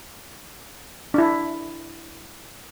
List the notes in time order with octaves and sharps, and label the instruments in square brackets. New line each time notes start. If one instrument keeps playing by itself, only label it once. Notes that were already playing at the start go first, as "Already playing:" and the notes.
[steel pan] D4 E4